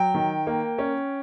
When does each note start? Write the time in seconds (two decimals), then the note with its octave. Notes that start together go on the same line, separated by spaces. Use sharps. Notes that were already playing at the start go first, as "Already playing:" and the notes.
Already playing: F#3 G5
0.14 D#3
0.47 A#3
0.78 C#4